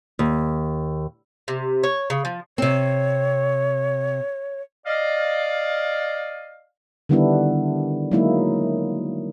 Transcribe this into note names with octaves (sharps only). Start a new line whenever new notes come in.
D#2
C3
C#5
C#3
F3
C3 C4 C#5
D5 D#5 F5
D3 D#3 G3 B3 D4 E4
F#3 G#3 A#3 D#4 E4